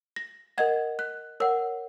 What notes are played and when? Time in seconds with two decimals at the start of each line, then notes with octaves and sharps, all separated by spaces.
0.16 A#6
0.58 A#4 D#5 F#5 G#6
0.99 F#6
1.40 A#4 C#5 F#5 E6